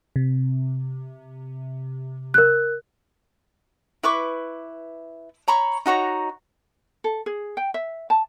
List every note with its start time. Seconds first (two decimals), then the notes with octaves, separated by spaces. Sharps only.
0.16 C3
2.34 A#4 F#6
4.03 E4 B4 C#6 D6
5.48 C#5 A#5 B5 C#6
5.86 D#4 F#4 C#5 A#5
7.04 A4
7.26 G#4
7.57 G5
7.74 E5
8.10 A5